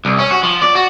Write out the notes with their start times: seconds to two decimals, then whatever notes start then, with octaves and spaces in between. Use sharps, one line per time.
0.05 C2
0.19 C#4
0.31 F#4
0.43 F3
0.62 D5
0.75 F#4